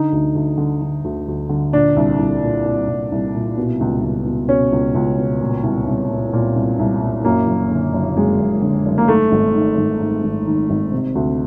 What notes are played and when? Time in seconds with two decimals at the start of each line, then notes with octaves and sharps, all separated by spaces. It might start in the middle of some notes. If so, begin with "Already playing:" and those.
Already playing: D3 D#4
0.12 D2
0.35 D2
0.58 D3
0.82 D3
1.04 D2
1.28 D2
1.49 D3
1.73 A#2 D4
1.96 C2
2.19 C2
2.42 A#2
2.66 A#2
2.88 C2
3.12 C2
3.34 A#2
3.57 B2
3.80 C#2
4.02 C#2
4.25 B2
4.49 B2 C#4
4.72 C#2
4.95 C#2
5.18 B2
5.40 A#2
5.63 C2
5.87 C2
6.10 A#2
6.33 A#2
6.55 C2
6.79 C2
7.02 A#2
7.24 F#2 A#3
7.47 F#1
7.70 D3
7.93 F#1
8.17 F#2 G#3
8.39 F#1
8.62 D3
8.86 F#1
8.98 A#3
9.08 G#2 A3
9.32 G#1
9.55 D#3
9.77 G#1
10.01 G#2
10.24 G#1
10.46 D#3
10.70 G#1
10.92 C3
11.15 D2